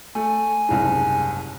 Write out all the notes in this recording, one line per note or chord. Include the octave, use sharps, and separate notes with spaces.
A3 G#5
F#1 C2 G#2